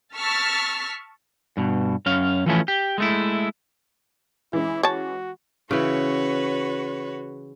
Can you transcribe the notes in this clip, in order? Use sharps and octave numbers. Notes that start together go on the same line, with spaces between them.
A5 C#6 E6 F6 A6 B6
G2 B2
F#2 C#4 F5
E3 F3 A3 C#4
G4
G#3 A3 E4
E3 G#3 C#4 E4
F#4 C#5 A5
C#3 E3 F#4 B4 C#5